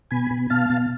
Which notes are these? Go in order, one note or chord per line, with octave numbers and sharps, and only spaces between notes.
B2 G#5 B5
B2
B2 F5 A5
B2